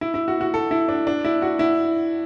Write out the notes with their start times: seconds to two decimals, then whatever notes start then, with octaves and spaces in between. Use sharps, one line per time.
0.01 E4
0.14 E4
0.28 F#4
0.41 F#4
0.54 A4
0.71 E4
0.88 D4
1.07 D4
1.24 E4
1.42 F#4
1.59 E4